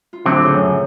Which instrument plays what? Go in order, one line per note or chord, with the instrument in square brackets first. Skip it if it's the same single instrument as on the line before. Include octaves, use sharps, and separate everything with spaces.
[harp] F4
[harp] A2 F#4 [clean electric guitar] D3 F#3 C4
[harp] C#3 G6
[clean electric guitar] F#2